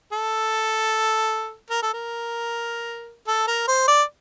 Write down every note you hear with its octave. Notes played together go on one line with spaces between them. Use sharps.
A4
A#4
A4
A#4
A4
A#4
C5
D5